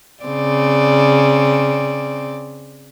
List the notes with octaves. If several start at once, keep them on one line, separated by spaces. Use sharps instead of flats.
C#3 C4 D5